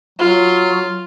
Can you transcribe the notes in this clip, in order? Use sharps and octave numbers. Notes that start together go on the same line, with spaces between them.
F#3 F4